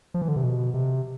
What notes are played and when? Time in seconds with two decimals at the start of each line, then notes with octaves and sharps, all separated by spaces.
0.14 F3
0.22 E3
0.28 D3
0.36 C3
0.43 B2
0.74 C3